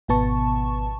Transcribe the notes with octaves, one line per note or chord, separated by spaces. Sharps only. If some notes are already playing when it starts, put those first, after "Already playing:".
G#1 B2 B3 A5 C#6